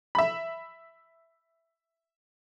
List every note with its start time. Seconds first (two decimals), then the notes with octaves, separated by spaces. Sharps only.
0.15 E5 B5